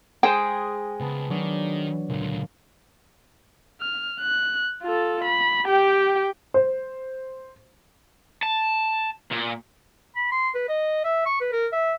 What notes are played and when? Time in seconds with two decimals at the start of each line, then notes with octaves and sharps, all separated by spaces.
0.23 G#3 G#4 C5 G5
1.00 C#2 B3 A5
1.30 D#3 F#3 D4
2.10 C#2 A#2 D3
3.81 F6
4.21 F#6
4.83 F4 A4
5.24 B5
5.66 G4 G5
6.54 C5
8.43 A5
9.31 A#2
10.16 B5
10.31 C6
10.55 B4
10.69 D#5
11.04 E5
11.26 C#6
11.40 B4
11.52 A#4
11.72 E5